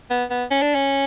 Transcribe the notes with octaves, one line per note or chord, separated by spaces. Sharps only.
B3
B3
C#4
D4
C#4